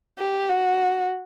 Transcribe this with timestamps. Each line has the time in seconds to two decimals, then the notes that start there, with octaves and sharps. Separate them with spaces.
0.18 G4
0.49 F#4